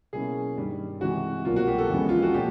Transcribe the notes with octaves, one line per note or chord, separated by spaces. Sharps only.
B2 F#3 A#3 C#4 E4 G#4
G2 D#3 G3
C3 E3 G#3 F#4
C2 B2 F#3 A#3 F4
F#4
G4
A4
F2 C#3 E3 G#3 B3
F4
F#4
A#2 F3 G4